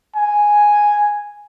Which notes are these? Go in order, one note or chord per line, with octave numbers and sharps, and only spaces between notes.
G#5